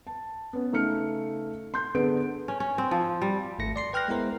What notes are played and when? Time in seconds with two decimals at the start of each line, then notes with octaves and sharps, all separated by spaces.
0.07 A5
0.53 B3 C#4
0.72 C#3 A3 D#4 F6 C#7
1.74 C6 G6
1.95 D3 B3 G#4 A4 B4 D7
2.48 C#4
2.60 C#4
2.78 C4
2.91 F3
3.22 G3
3.59 G#1 A3 A#6 C#7
3.76 D5 C6 C7
3.93 B4 G5 F6 F#6 A#6
4.08 G#3 B3 E4 A#4 C5